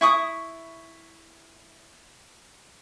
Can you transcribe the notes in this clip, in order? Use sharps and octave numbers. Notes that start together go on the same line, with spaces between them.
E4 C#6 D#6